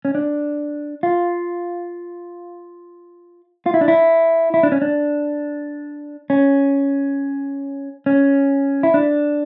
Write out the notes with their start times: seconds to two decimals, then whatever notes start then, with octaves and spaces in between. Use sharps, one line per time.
0.05 C#4
0.15 D4
1.03 F4
3.66 F4
3.74 E4
3.81 D4
3.88 E4
4.54 E4
4.63 D4
4.72 C#4
4.82 D4
6.30 C#4
8.06 C#4
8.83 E4
8.94 D4